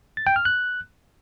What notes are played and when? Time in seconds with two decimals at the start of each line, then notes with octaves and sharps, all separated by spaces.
0.17 A6
0.27 G5
0.36 F6
0.45 F#6